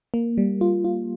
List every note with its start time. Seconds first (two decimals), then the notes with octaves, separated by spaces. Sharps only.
0.14 A#3
0.38 G3
0.61 F4
0.84 F4